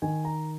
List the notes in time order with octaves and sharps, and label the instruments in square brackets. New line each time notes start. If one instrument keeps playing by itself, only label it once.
[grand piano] D#3 G#5
A#5